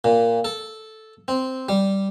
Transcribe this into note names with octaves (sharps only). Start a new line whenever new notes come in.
A#2
A4
C4
G3